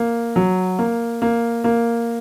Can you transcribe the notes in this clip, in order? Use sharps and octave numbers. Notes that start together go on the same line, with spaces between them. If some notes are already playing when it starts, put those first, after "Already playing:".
Already playing: A#3
F#3
A#3
A#3
A#3